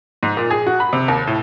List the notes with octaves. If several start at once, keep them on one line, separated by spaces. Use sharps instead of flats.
G#2
A#2
G#4
F#4
B5
C3
D#2
A2